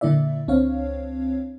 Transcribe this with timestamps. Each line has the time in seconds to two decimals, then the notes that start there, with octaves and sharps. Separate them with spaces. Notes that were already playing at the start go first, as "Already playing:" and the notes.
0.01 A#2 D3 A#3 E4 D5 E5
0.48 C#2 C4 D4 C#5 F5